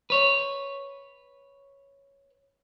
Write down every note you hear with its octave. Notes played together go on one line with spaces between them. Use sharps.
B4 C#5